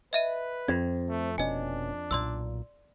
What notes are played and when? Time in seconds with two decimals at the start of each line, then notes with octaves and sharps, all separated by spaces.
0.13 B4 D#5 E5 D#7
0.68 F2 C4 G#6
1.09 A3
1.38 F1 B2 C#4 D4 D#5 G#5
2.11 B1 A#2 D5 C6 E6